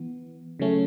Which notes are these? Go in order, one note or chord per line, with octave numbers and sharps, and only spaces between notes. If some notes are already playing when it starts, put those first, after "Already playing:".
Already playing: E3 B3
C#3 F#3 A3 C#4